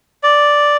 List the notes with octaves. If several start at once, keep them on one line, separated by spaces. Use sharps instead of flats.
D5